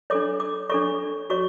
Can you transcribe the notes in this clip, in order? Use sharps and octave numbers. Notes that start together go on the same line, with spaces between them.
D4 A4 C#5 D6
D6
D4 A4 C#5 C#6
F#4 C#5 C#6